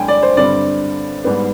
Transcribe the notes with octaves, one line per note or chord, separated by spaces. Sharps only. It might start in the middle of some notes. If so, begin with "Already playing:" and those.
Already playing: G2 D3 G#3 G5 G#5
D5
C5
G2 D3 G3 C4 D5
G#2 G3 B3